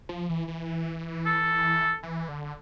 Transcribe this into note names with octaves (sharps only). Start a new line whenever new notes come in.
F3
E3
E3
A4
E3
D3